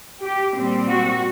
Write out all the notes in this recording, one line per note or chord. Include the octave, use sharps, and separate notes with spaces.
G4
A#2 G3 C4
F#4